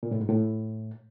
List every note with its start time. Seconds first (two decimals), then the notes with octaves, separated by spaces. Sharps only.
0.03 A#2
0.11 A2
0.20 G#2
0.29 A2